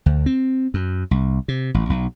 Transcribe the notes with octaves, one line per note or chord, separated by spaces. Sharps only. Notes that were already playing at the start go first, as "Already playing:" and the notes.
D2
C4
F#2
C2
C3
A1
B1